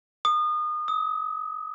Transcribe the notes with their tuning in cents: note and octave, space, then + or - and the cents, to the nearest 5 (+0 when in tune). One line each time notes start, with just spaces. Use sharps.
D#6 -30
D#6 +35